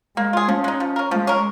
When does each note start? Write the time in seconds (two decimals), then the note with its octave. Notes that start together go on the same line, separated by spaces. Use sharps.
0.17 G#3 A#3
0.33 F4 G#4
0.48 F3 C#4
0.64 G#3 D#4
0.80 F3
0.96 C#4 A#4
1.11 F3 G#3
1.27 C#4 A#4